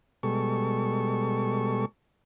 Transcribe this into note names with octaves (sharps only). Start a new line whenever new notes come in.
B2 G3 G#3 A4 C#6